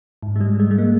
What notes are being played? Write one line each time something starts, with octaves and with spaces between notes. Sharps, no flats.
G#2
G#3
G3
G#3
G#3
A#3